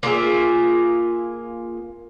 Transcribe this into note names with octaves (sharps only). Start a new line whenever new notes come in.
A#3 F4 G#4 E5